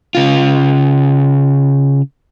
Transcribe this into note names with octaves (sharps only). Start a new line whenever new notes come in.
C#3 F4